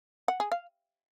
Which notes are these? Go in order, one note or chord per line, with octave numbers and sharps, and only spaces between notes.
F#5
G#4
F5